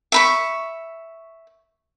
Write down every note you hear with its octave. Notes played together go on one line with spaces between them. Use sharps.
E5 B5 C#6